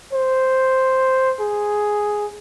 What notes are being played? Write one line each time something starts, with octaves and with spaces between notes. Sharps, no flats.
C5
G#4